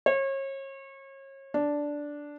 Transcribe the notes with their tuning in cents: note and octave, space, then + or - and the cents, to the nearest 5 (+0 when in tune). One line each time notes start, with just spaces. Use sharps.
C#5 -35
D4 -5